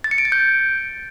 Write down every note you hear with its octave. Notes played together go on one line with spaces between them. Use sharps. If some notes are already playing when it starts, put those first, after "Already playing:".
A6
C#7
D7
A6
G6